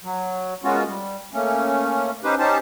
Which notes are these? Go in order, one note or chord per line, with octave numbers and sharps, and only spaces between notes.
F#3
G#3 A#3 B3 C#4 F4 F#4
G3
A3 A#3 C#4
C#4 D#4 G4 B4 C5
C#4 D#4 G4 C5 A5